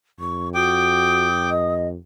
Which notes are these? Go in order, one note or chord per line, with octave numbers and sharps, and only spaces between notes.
F2 C#6
F#4 G5 D6 D#6
D#5